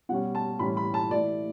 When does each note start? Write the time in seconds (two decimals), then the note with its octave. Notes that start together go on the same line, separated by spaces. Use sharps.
0.09 B2 G3 C#4 F#5
0.35 A5
0.59 A2 E3 G3 C#4 B5
0.77 B5
0.94 A5
1.10 E3 A3 E4 D5